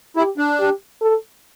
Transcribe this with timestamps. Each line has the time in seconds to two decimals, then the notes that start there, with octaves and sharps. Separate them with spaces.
0.17 E4 G4
0.38 D4
0.59 G4
1.02 A4